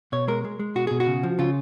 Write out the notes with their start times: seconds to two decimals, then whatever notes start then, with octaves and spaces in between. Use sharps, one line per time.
0.12 B2 C#5
0.28 G#3 A#4
0.45 G#3
0.59 G#3
0.75 B2 F#4
0.87 B2 G#4
1.00 F#4
1.07 C#3
1.23 F3
1.39 C#3 F4